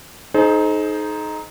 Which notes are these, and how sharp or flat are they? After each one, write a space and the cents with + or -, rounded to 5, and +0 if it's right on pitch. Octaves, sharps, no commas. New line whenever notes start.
D#4 +0 G#4 +45 C5 +0